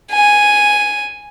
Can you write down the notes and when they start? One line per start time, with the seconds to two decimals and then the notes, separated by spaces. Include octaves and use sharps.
0.11 G#5